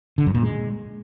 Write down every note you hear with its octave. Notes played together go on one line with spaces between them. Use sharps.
D3
F#2
A#2
G#3